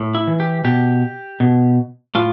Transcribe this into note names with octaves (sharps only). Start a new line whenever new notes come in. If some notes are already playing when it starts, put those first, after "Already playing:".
Already playing: A2
E4
E3
G4
B2 G4
B2
A2 F4